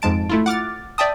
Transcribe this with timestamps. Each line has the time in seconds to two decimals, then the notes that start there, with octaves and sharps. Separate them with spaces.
0.02 F2 G#2 G#3 A5 D7
0.29 A3 E4 F4
0.46 F#5 D6 F6 A6
0.98 D5 E5 G5 A5 D#6